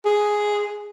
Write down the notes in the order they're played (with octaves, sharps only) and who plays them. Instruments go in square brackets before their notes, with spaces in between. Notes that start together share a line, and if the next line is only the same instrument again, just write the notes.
[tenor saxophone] G#4